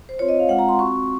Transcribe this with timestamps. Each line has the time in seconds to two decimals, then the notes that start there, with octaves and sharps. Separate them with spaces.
0.09 C5
0.19 C4 F4 C#5
0.29 D#5
0.40 F5
0.49 G#3 C4 F4 F#5
0.59 A#5
0.69 C6
0.79 C4 F#4 C#6